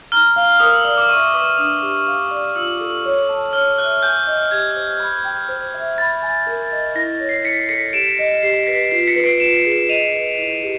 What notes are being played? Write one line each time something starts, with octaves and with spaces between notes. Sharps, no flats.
A#5 F6
F5
A#4 D#6
E6
D5 D#6
D6
E5 C#6
B4 D6
D4 D#6
G4
F5
D5
F4 E6
A4
C#5
A5
C#5 F6
E5 F#6
G#5 G6
D#5
G4 G#6
C5
B5
G5
C5
E5
B5 A6
G#5
A#4
D#5
E4 A#6
C#5
C7
E4 B6 C#7
A4 B6 C#7
G4 D7 E7
D#5
G4 C7
B4 B6
F4 C7
B6 C#7
B4
C7 D7
F4 D7 E7
G#4
D#5 D#7 F7
B4
E4
G4